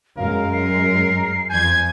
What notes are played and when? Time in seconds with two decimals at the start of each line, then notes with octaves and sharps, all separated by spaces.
0.17 F#2 G#3 A#4 F5
0.53 C7
1.50 F2 G#5 G6 G#6